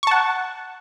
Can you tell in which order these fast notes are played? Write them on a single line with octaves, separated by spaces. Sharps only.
C#6 A5 F#5